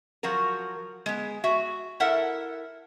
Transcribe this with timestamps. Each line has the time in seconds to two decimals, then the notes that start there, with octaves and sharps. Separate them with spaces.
0.23 F3 F#3 F#4 A#4
1.06 G#3 B3
1.44 F#4 E5
2.00 E4 A4 A#4 E5 F#5